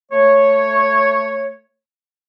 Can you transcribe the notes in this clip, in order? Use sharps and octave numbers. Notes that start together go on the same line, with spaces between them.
A3 C#5